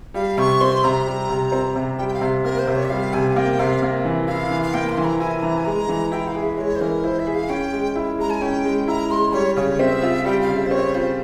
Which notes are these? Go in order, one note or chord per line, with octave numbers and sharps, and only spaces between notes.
G3 F5
C3 C#6
C4 C6
C3 A#5
G3
C3
C4
C3
G3 G5
G5
F5
C3
A#3 A#4
C5
C3
C#5
E5
G3 F5
C3 G#5
F5
A#3 G5
C3 F5
A#3
E3
E4 F5
E3
F5
A#3 G5
C6
E3
A#5
E4 G#5
E3 A#5
G#5
G#3 A#5
E3
E4 G5
F5
G#4
E5
G#3 C#5
C5
E3 A#4
E4 C5
E5
G#4
F5
C#4 G5
G#3
E4
G#3 A#5
G#5
C#4 G5
G#3
E4 A#5
G#3 C6
G3 C#5
C#3 C#5
C4 E5
F4
G3 G5
F5
C#3
E5
C5
C4 C#5
F4 C5